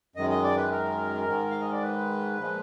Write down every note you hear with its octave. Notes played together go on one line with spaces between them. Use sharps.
F#2 D#3 G#3 D#5
D#5
D5
B4
A#4
G#2 D#3 G#3
F5
D#5
D5
B4
A#2 F3 G#3